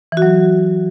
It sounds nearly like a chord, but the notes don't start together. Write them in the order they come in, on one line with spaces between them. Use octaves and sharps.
E3 F#4 F#3